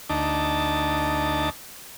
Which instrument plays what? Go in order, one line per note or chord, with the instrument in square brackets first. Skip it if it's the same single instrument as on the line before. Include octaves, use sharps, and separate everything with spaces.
[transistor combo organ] D2 D#4 A5 D6